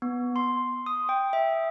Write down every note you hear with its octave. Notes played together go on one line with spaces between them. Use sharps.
B3
C6
D#6
G5
E5